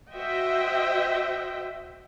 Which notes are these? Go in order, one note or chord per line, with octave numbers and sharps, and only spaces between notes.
F#4 C5 D#5 E5 G5